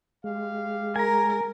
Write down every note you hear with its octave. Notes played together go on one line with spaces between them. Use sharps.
G#3 G4 F5
A#4 G#5 A#5